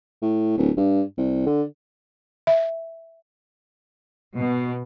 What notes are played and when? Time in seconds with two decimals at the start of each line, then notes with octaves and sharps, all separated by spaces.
0.22 A2
0.57 D1
0.77 G2
1.17 C2
1.46 D3
2.47 E5
4.34 B2